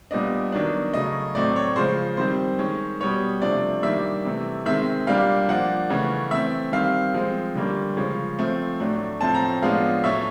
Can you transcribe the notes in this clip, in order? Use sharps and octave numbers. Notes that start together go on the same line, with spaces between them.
A#2 G3 B3 D4 D#5
D#3 F#3 B3 D4
C#3 F#3 A3 D#5
A2 F#3 A3 C4 D5
C#5
C#3 F3 G#3 C5
D#3 G3 C4 C5
D#3 G#3 C#4
B2 G3 B3 C#5
C3 F3 A3 D4 D5
D#3 G3 A#3 D4 E5
C3 E3 A3
D#3 G#3 C4 E5
A#2 G3 A#3 D4 F5
F3 A#3 D4 F#5
C#3 E3 A3 C#4
E3 A3 C4 E5
D#3 G3 C4 F5
F3 G#3 C4
D3 G3 A#3 C#4
C#3 F3 G#3 C#4
F3 A3 C4
A2 F#3 A3 D4
A2 F3 A3 C4 A5
A#5
A2 F3 G#3 B3 D4 F5
A2 F#3 A3 C#4 E5